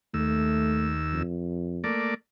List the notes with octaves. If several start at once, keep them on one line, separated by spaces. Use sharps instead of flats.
D#2 A3 E6
F2
A3 A#3 D5